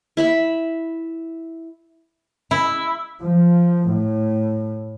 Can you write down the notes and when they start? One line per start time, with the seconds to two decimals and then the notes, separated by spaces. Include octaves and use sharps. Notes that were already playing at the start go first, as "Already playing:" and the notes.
0.17 E4 E5 B5
2.51 E4
3.21 F3
3.88 A2